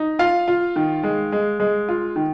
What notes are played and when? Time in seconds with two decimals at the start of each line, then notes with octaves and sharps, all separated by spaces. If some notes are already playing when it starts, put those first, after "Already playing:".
Already playing: D#4
0.19 F4 F5
0.48 F4
0.76 D#3
1.04 G#3
1.32 G#3
1.60 G#3
1.89 F4
2.16 D#3